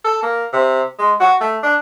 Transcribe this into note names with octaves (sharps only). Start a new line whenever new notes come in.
A4
A#3
C3
G#3
F#4
A3
D4